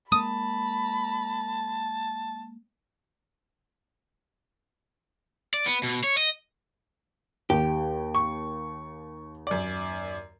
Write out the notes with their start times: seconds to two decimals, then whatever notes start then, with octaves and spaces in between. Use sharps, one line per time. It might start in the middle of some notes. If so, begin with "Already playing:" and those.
0.12 G#3 A#3 A5 B5 D#6
5.54 D5
5.66 B3
5.83 B2
6.04 C#5
6.17 D#5
7.50 D#2 G4
8.15 C#6
9.47 F#2 D5